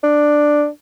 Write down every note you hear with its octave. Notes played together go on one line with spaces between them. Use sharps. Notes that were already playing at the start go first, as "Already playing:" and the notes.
D4